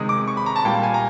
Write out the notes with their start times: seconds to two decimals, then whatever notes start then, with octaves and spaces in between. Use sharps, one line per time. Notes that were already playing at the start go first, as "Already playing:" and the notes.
Already playing: C3 D#3 G#3 D#6
0.09 D6
0.28 C#6
0.37 B5
0.46 A#5
0.56 A5
0.65 A#2 G3 A#3 G5
0.83 G#5
0.94 A#5